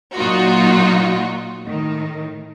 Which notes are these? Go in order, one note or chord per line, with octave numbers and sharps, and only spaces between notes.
A#2 F#3 D#4 F4 F#4
A2 D#3